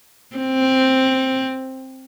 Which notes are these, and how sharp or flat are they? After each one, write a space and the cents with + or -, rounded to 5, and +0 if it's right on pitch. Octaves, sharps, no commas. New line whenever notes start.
C4 +5